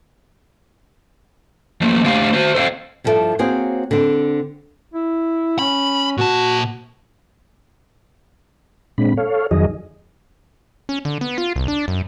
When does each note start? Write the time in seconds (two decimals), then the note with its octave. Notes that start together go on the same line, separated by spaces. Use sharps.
1.81 F3 A3 A#3
2.04 D3 A3 G4 C5 F5
2.34 F#4 C5
2.55 A4 C5 E5 F5
3.04 G2 F3 E4 A4 D5 E5
3.39 A#3 C4 F#4 G#4 C5 C#5
3.91 D3 C4
4.94 E4
5.59 C#4 B5
6.18 A#2 F#4 A5
8.98 A#2 G#3 C4 D4 B5
9.17 A4 C#5 F5
9.51 F2 D#3 F#3 G#4 D#5
10.89 C#4
11.05 D3
11.21 B3
11.38 F4
11.56 C2
11.68 D4
11.88 F#2